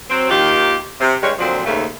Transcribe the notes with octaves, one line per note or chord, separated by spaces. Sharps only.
F#3 C4
D#2 D#3 F4 G4
C3
G2 G3 G#3 C#5
A#2 D3 F3 F#3 C4
D#2 G#2 C#3 A3 A#3